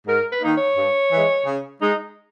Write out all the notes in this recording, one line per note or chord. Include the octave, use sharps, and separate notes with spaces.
G#2 A#4
B4
D#3 A#3 D#4
C#5
G2
E3 G#3
C#3
G#3 D#4